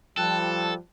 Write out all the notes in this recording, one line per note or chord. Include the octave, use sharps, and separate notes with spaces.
F3 G3 A4 G5 A5 F#6